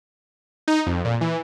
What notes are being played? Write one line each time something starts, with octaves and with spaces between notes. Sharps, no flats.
D#4
F2
A#2
E3